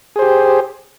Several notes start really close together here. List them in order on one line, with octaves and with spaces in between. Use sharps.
G#4 C5 G4